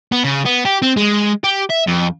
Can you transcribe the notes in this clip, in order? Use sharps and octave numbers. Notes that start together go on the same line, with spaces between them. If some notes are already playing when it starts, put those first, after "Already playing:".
B3
C#3
B3
G4
C4
G#3
G4
E5
F2